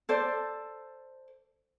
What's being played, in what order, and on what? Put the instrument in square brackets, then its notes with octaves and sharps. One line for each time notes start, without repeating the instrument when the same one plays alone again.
[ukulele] A4 C5 D5